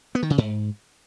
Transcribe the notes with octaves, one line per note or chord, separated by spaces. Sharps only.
B3
D#3
C#3
G#2